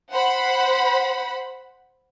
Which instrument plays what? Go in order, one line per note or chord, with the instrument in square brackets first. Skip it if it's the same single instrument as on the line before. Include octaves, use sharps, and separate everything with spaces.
[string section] C5 F#5 B5